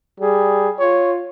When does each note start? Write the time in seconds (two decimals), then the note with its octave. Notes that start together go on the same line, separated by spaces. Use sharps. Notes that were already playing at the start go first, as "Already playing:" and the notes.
0.20 G3 G#4
0.79 F4 C#5